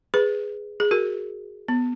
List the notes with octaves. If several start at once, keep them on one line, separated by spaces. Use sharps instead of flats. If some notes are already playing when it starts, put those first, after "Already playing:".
G#4 B4
G#4
F#4 A#4
B3